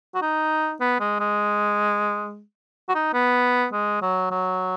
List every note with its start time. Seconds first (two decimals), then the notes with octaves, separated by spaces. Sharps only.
0.15 F#4
0.22 D#4
0.81 B3
1.00 G#3
1.20 G#3
2.89 F#4
2.95 D#4
3.14 B3
3.72 G#3
4.02 F#3
4.31 F#3